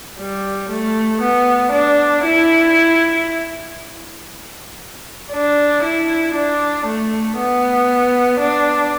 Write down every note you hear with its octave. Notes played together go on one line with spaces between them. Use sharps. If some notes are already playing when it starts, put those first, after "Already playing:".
G3
A3
B3
D4
E4
D4
E4
D4
A3
B3
D4